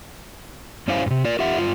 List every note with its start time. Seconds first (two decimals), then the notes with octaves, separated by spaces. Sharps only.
0.88 G2 C#4 E4 C5 F5 G#5
1.06 G2 C3
1.24 F4 A#4 D5
1.39 F4 G4 E5 F#5
1.57 G2 F4